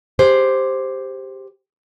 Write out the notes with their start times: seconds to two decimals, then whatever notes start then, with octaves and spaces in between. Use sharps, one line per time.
0.19 G4 G#4 C5